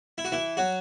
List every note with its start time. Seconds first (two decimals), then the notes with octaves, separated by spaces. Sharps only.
0.18 E4
0.25 F#4
0.32 E3 E4
0.57 F#3 F#4